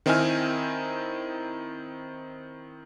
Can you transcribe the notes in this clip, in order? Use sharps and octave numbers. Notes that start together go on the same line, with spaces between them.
D#3 C4 D#4 E4 G#5 F6